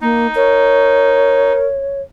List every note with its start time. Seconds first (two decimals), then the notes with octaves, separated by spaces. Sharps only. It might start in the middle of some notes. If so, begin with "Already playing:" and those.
0.01 A#3 D#4
0.35 A#4 C#5